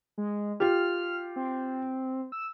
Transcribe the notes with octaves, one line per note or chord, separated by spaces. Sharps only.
G#3
F4 G4 F6
C4
E6